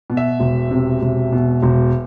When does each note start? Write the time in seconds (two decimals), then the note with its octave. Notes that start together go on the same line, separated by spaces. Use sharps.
0.10 B2
0.17 E5
0.40 E1
0.71 C3
1.02 E1
1.32 B2
1.63 E1